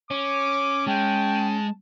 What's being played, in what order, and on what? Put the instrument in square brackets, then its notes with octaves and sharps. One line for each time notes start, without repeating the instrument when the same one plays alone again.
[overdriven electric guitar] C#4 [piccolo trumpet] D6
[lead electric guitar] G#3 [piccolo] G5 [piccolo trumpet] A5